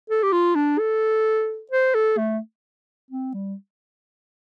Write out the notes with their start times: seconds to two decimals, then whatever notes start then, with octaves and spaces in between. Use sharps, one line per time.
0.10 A4
0.23 G4
0.32 F4
0.55 D4
0.79 A4
1.71 C5
1.95 A4
2.18 A3
3.10 C4
3.34 G3